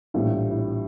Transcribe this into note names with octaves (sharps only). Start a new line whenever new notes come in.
A#1 A2 E3 G3 F4
E4